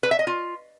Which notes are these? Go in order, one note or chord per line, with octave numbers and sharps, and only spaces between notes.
B4
E5
D#5
F4